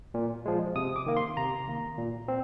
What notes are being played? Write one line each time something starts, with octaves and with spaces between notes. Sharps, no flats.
A#2
F3 G#3
C3 D#6
D6
D#3 A#3
C6
C3 A#5
D#3 A#3
A#2
C4